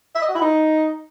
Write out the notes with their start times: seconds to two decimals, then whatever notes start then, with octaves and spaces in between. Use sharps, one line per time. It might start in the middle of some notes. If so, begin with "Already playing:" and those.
0.15 E5
0.22 D#5
0.28 F#4
0.35 E4
0.42 D#4